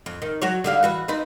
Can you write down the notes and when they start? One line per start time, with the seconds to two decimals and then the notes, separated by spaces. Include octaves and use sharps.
0.06 F2
0.22 D#3
0.42 F#3 F#4 C#5
0.64 D3 G3 F5
0.83 E3 F#4 B4
1.08 C4 D#4 B4